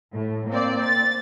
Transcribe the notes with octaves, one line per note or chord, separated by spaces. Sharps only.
A2
A#3 C4 D5
A6